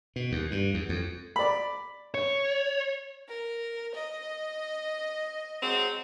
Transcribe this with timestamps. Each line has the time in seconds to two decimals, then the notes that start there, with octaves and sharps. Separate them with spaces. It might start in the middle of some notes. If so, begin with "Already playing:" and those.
0.16 B2
0.32 D#2
0.51 G2
0.74 E2
0.89 F2
1.36 D5 B5
2.14 C#5
3.28 A#4
3.94 D#5
5.61 F#3 G#3 C4